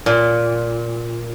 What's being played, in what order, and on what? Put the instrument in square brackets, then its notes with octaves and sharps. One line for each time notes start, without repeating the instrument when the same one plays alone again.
[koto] A#2